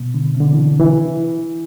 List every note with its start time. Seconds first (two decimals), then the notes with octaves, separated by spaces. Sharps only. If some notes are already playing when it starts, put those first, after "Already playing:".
Already playing: B2
0.14 D3
0.35 C3
0.40 D3
0.53 E3
0.79 E3